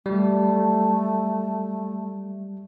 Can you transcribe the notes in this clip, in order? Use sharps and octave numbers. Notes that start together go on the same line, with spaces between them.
G3 A3